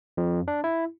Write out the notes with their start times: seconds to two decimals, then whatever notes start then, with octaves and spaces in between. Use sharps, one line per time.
0.17 F2
0.48 D4
0.64 E4